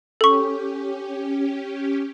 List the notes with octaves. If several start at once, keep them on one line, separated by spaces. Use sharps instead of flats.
C#4 G4 A4 C#6